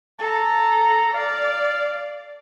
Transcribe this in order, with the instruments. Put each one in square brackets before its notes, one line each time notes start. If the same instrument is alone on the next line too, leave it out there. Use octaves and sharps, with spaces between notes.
[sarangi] A4 [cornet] A#5
[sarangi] D5 [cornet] F5